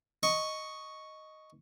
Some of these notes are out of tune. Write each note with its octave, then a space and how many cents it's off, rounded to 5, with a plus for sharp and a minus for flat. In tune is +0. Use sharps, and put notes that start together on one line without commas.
D#5 +0 C#6 +0